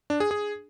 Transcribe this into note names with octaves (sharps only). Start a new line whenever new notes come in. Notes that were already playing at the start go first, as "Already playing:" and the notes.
D4
G#4
G#4